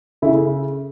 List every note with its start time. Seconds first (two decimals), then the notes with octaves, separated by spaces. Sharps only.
0.22 C#3 E4 A4